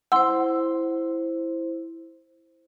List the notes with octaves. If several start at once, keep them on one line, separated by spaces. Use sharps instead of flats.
E4 C5 F#5 C6 E6